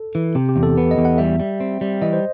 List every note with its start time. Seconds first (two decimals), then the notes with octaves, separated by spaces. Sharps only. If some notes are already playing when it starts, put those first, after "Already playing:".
Already playing: A4
0.15 E3
0.35 C3 G4
0.49 G4
0.56 E2
0.63 A4
0.77 B3 B4
0.91 D#5
0.98 E2
1.05 F#5
1.18 G3 E5
1.40 G3
1.60 C4
1.81 G3
2.02 E3 D#5
2.13 C5